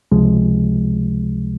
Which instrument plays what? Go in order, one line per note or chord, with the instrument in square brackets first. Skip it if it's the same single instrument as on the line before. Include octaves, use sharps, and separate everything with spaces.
[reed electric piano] C#2 C3 F3 G#3